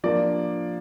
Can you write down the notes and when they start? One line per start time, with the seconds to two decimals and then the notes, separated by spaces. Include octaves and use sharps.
0.04 F3 A#3 D4 D5